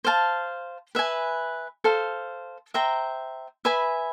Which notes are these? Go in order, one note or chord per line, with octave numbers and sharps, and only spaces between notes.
C5 F5 A5
B4 E5 G#5
A4 C5 F5
C5 E5 G5 A#5
B4 E5 G#5 B5